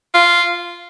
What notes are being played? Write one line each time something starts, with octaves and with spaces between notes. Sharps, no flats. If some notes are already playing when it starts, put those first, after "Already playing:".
F4